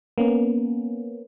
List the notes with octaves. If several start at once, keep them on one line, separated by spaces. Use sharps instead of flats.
A#3 B3 C#4